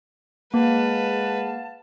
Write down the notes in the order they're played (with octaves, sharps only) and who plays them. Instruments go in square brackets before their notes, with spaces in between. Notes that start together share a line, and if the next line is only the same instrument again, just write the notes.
[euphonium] G#3 [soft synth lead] A#3 [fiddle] B4 [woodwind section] F5 F#5 A5